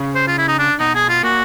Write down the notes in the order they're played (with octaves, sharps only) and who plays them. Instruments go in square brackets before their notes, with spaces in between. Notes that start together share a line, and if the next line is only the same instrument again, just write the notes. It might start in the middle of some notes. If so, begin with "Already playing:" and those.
Already playing: [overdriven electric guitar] C#3
[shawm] C5
F4
E4
D#4
D4
[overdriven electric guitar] B2 [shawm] D#4
[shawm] G#4
F4
[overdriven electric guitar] A#2 [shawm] F#4